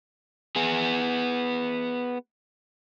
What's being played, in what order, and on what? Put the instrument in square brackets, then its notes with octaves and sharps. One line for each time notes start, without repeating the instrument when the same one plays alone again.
[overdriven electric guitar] B3 G#4